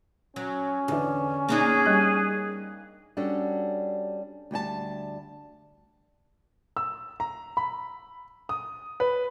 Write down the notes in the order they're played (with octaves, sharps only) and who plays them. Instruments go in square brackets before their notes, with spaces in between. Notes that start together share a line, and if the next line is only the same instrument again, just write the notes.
[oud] F#3 [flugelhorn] C#4
[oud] E2 [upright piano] D3 D4
[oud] A#3 D4 D#4 [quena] G#4
[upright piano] G3 D#5 F#6
[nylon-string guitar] G3 C#4 D4 F#4 A4
D2 G3 G5 A5
[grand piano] E6
A#5
B5
D#6
B4